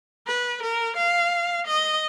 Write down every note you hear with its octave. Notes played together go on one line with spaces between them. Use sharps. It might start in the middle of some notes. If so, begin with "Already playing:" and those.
B4
A#4
F5
D#5